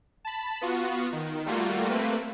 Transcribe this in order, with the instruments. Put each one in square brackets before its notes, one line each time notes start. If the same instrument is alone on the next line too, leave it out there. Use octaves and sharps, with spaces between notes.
[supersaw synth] A5 B5
B3 F4 F#4
D#3
G3 A3 A#3 F4 F#4
A3 A#3 C4 B4